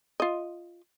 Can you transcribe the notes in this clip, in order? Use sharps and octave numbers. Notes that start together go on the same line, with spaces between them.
F4 D#5